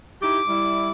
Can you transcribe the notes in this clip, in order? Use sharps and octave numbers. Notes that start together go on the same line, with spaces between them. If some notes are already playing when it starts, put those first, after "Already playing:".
D#4 E4 G4 D6
G3 E4